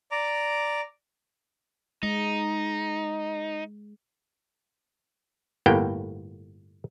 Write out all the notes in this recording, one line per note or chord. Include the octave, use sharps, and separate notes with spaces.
D5 A#5 D6
G#3 D#4
G1 A2 A#3 B3 G5